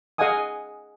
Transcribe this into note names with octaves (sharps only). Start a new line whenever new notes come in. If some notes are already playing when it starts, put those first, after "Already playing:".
G#4 D#5 F5 F#5 G#5 D#6